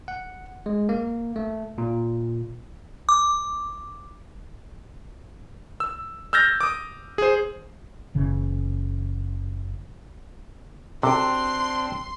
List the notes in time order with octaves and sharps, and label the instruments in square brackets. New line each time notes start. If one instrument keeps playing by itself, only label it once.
[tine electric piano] F#5
G#3
A#3
A3
A#2
[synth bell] D6
[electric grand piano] E6
E6 F6 G6 A6 A#6
D6 D#6
G#4 C5
[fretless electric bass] F#1 C#3 E3
[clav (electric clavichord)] C3 [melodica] C4 D4 [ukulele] F#4 A4 G5 [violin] C6